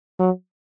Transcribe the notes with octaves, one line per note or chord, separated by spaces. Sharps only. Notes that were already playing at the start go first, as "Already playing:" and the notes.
F#3